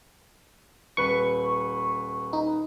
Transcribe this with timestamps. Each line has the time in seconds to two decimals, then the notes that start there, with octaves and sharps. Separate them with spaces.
0.97 D#1 B4 C#6
2.33 D#4